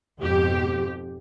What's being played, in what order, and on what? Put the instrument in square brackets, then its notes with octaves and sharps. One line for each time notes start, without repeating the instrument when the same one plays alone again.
[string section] F2 G#2 B2 [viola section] G4